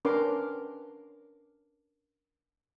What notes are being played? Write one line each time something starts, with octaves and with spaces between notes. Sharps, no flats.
C#4 D4 A#4 B4 C6 D6